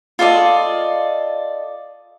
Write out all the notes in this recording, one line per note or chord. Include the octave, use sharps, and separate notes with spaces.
F4 A4 D5 D#5